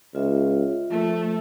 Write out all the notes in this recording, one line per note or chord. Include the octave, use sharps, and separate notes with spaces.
C#2 F4 E5
F3 A3